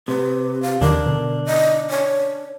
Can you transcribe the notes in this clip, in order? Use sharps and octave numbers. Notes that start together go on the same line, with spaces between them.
C3 B4
F5
D#2 D3 D#3 D4 A#4
B2 D3
D#5
C#5